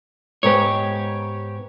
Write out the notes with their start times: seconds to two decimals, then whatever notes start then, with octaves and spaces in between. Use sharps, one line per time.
0.43 G#2 B3 G4 C#5